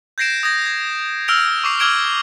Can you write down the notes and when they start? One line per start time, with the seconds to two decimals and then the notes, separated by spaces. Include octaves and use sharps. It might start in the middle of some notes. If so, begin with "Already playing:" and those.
0.18 G6 G#6 A#6 C7 D7 E7
0.43 D#6 G6 G#6 A#6
0.66 G#6
1.28 E6 F6 A#6 D7 F7
1.64 C#6 D6 C7
1.79 D6 E6 F6 G#6 D7 G7